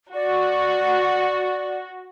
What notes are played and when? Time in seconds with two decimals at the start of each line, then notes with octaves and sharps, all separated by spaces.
0.14 F#4 D5